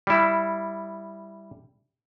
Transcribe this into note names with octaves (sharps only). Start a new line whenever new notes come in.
G3 E4